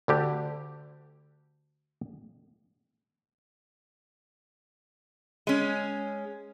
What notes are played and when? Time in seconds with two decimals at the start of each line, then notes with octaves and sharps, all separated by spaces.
0.08 D2 D3 G4
5.47 G#3 C#4